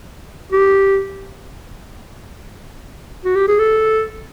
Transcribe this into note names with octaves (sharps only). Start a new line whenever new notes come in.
G4
F#4
G4
G#4
A4